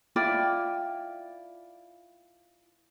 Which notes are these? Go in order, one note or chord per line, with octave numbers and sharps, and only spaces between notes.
E4 F4 D5 G5